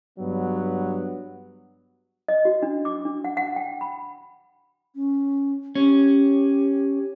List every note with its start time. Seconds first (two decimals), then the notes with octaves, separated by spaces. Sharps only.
0.19 G2 F#3 B3
2.28 D#5
2.45 F#4
2.63 D4
2.85 D6
3.05 D4
3.24 F#5
3.37 F#5
3.56 G5
3.81 B5
4.95 C#4
5.75 C#4 G4